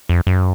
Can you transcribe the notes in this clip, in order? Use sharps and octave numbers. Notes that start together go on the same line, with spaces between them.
F2
F#2